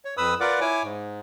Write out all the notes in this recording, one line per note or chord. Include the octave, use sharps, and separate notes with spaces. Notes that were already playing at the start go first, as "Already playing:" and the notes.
C#5
F2 B4 B5 D#6 E6
F4 A#4 B4 D5 F#5 D6
E4 C#5 G#5 D6
G#2